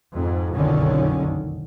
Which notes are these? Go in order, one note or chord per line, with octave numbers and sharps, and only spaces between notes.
F2 G#2
F#1 B1 F2 D3 D#3 C#4